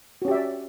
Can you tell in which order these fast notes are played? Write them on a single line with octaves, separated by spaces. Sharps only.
F#4 C#4 G4 E5 D5